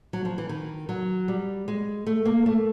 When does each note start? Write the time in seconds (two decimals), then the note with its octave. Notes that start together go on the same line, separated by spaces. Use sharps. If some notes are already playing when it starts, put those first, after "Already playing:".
0.13 F#3
0.25 F3
0.38 E3
0.49 D#3
0.89 F#3
1.28 G3
1.68 G#3
2.07 A3
2.25 A#3
2.46 A3